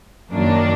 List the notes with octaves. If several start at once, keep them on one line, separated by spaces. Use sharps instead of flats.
F#2 D#3 F#3 A#3 D4